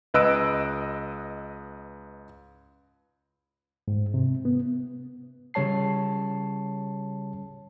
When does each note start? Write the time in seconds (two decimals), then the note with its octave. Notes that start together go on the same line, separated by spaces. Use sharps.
0.14 C#2 B4 D#5 E6 F#6 D7
3.88 G#2
4.14 C3
4.45 B3
5.54 C#3 G3 C#5 A5 C7